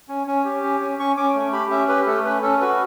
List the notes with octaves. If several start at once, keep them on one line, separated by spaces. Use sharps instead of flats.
C#4
C#4
G4
C#4
C#4
C#4 C#6
C#4 D6
A3
G4 B5
C#4 E5
G4 B4
A3 A4
C#4 B4
C#4 A4
F#4 B4